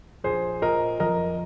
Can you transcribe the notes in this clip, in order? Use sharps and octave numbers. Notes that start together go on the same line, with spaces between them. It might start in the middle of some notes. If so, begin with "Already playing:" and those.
A#1 G#4 C5
A#2 A#4 D#5
F2 A#4 D#5